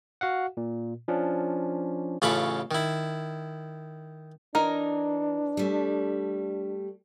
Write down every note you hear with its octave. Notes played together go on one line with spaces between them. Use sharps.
F#4 F5 F#5
A#2
F3 C#4 D4
A1 C#3 F4 A4 B5 C#6
D#3 E4
E3 D4 D#4 A#4
G3 A3